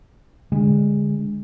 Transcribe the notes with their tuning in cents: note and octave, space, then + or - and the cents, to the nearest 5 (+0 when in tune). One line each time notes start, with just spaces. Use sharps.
D3 -20 G#3 -25